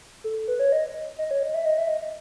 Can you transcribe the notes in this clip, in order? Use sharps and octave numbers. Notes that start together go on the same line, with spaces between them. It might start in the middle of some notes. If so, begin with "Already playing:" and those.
A4
B4
C#5
D#5
D#5
C#5
D#5
E5
D#5
E5
D#5
D#5